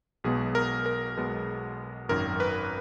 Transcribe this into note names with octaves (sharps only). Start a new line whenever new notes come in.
B1 B2 G#3 B3 G#4
A#4
A#4
B1 B2 G#3 B3
G#1 F#2 D#3 A#4
B4